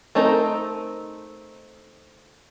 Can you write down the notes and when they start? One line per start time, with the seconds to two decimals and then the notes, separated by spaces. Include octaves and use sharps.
0.15 A3 C4 D#4 A4 A#4